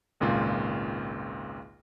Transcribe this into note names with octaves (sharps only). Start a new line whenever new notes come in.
G#1 C#2 A#2 F4